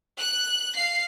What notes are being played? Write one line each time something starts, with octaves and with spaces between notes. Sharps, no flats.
F#6
F5 C7